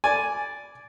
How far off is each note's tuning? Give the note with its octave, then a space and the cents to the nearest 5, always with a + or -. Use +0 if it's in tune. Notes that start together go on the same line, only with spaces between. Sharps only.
D5 -10 G#5 +0